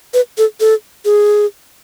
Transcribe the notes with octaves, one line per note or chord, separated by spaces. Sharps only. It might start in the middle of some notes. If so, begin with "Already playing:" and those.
B4
A4
A4
G#4